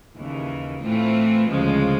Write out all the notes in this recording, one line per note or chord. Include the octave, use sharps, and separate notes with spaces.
D#2 C#3 E3
A2 E3 A3 C4 F4
D2 C#3 F3 G#3